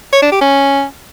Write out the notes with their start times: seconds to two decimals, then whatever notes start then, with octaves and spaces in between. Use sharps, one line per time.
0.13 C#5
0.22 D4
0.32 G4
0.41 C#4